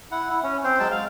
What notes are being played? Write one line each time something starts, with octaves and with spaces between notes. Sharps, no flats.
E4 F#5
E4
C#4
C4 C5
F#3 G#3 G5 A5
F5